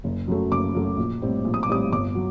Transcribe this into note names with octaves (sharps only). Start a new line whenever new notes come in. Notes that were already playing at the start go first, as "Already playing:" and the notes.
F#1
F#2 F#3 A3
F#1 D6
F#2 F#3 A3
A#1
A2 G3 C4
A#1
D#6
D6
A2 G3 C4 D#6
G1 D6
F#3